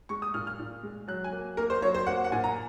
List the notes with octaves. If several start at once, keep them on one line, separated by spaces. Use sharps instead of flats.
G#3 C#6
D#6
A#2 F6
F6
A#2
G#3
F#3 F#6
G#5
A#3
A#3 A#4
C5
F#3 C#5
C5
A#3 F#5
F#5
A#2 G#5
A#5